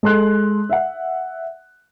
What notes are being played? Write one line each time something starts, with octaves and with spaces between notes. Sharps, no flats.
G#3 A4 C6 F#6
E5 F#5